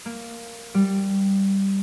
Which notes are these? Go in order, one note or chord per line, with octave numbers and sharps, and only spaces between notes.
A#3
G3